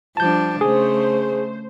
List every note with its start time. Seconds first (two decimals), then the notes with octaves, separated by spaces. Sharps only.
0.17 F3 G3 D4 A5 G6
0.61 C#3 A3 G#4 C5